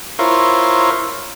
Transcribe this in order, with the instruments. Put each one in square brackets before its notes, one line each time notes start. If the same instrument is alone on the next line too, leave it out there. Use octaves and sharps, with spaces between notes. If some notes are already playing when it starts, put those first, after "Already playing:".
[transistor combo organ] E4 F4 A#4 C5 C#5